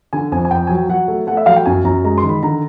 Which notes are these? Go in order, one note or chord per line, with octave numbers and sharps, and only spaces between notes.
D3 G#5
F2 G#5
G#5
F2 G5
F#3 G#5
G5
F#3 F#5
A3
A3 F#5
E5
F#3 F5
G5
F#2 G#5
F#2 A#5
G#3 A#5
C6
D#3
B5
D3 A#5